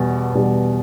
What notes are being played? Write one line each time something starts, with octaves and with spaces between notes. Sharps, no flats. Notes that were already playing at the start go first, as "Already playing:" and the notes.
Already playing: E2 B2 G3
E2 B2 G3